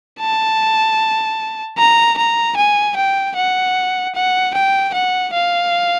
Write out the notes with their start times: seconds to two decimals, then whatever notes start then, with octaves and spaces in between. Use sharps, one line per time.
0.20 A5
1.78 A#5
2.18 A#5
2.57 G#5
2.96 G5
3.36 F#5
4.15 F#5
4.54 G5
4.94 F#5
5.34 F5